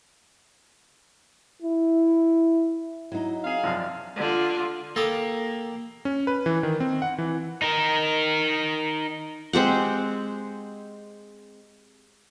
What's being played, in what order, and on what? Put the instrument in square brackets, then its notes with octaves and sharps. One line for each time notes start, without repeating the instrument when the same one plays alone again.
[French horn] E4
[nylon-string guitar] F#3 D#4 [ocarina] E4
[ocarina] C4 [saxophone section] G#4 F5
[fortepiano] F#2 C3 F3 [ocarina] D5
[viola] D3 F4
[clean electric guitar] A#3 G4 [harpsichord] A4 B5 D#6
[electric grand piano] C#4
B4
E3
D#3
C4
F#5
E3
[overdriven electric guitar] D#4 A#4
[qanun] G#3 C4 G4 F#5